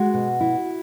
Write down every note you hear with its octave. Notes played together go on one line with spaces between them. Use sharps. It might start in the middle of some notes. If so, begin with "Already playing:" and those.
Already playing: G#3 F#4
B2
E4